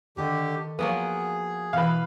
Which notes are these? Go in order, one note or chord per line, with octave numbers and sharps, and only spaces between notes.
D3 D#3 G4 A4 D#5
F3 F#3 A#3 B3 G#4
B2 E3 B4 F5